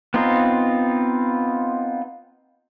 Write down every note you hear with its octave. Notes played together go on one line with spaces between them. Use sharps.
B3 C4 D#4 F4